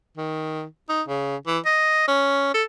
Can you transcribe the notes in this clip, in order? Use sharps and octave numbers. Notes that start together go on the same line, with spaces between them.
D#3
D#4
C#3
E3
D#5
C#4
A4